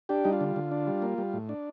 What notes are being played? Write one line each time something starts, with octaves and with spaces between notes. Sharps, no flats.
D4 G4
G3 D#4
F4
D3
D3
D4
G3
A#3
G3
A2
D4